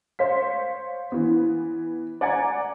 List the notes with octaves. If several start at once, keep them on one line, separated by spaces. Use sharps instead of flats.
C5 C#5 F5 B6
E3 B3
D5 F#5 G#5 A#5 G#6